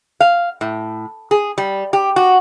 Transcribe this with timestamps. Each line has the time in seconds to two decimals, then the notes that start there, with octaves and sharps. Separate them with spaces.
0.20 F5
0.61 A2
1.31 G#4
1.58 G3
1.93 G4
2.16 F#4